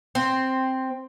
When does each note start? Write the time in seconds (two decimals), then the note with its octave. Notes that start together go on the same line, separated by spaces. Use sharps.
0.15 C4